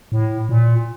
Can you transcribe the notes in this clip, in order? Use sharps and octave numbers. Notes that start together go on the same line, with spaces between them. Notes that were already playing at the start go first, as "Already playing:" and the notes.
A2
A#2